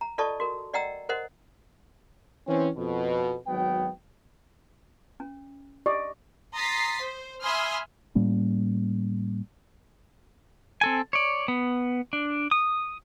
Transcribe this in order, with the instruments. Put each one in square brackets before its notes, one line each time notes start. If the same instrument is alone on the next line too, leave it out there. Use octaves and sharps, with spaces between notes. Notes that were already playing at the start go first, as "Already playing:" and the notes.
[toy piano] A#5
F4 A4 D5 D#5 A5 C#6
F#4 A#4
D5 D#5 F#5 G5 A#5 E6
A#4 C5 D#5 F#5
[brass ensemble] E3 C4 C#4
F2 B2
G#1 F#3 B3 G5
[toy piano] C#4
[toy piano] G4 [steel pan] D5 D#5
[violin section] A#5 C6 D#6 A6 B6 C7
C5
E5 G#5 B5 C6 D#6 F6
[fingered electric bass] A2 G3 A#3 C#4
[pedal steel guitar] C4 A4 G#5
C#5 D5
B3
D4
D#6